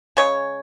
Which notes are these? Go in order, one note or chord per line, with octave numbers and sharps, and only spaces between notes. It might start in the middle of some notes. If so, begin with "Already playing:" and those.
C#3 G#3 C#5